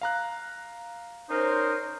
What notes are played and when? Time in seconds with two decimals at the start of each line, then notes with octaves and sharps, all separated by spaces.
0.01 F5 A#5 F#6
1.30 C#4 D#4 A#4 C5